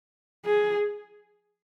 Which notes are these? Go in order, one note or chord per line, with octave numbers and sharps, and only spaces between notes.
G#4